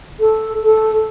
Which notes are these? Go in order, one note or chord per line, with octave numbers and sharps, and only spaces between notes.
A4
A4